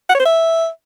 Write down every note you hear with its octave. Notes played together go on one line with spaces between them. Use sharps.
F#5
C#5
C5
E5